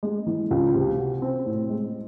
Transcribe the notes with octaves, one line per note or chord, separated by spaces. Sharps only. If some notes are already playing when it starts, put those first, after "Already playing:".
G#3
E3
C#2
C3
F#4
C4
A2
G#3